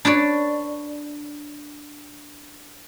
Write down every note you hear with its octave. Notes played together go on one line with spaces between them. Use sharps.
D4 B4 C#5 D5